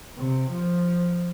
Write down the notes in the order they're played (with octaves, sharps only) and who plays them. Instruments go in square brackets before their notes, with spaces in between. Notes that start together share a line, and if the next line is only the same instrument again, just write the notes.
[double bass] C3
F3